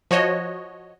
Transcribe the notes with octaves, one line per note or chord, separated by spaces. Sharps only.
F3 F#4 C#5 D#5